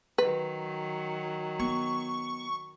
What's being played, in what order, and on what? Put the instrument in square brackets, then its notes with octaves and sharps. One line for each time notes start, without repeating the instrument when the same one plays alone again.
[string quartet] D#3 F#3 [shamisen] B4
[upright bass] B3 [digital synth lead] C#6